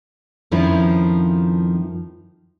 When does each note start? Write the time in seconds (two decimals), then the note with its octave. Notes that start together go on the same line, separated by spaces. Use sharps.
0.51 F2 D#3 F3 C#4 E4